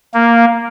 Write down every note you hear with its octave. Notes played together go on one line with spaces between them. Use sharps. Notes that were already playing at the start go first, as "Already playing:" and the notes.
A#3